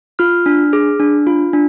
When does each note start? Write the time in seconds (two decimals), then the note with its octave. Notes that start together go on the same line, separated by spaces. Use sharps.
0.19 F4 F6
0.46 D4
0.73 G#4
1.00 D4
1.27 F4
1.53 D4